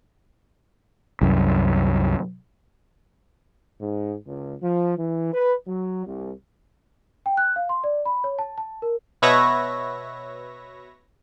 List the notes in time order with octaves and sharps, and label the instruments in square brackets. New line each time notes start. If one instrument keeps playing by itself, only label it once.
[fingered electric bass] C2 F#2
[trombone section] G#2
C#2
F3
E3
B4
F#3
C2
[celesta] G5
F#6
F5
C6
D5
B5
C#5
A5
A5
A#4
[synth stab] B2 B4 C#5 E5 A#6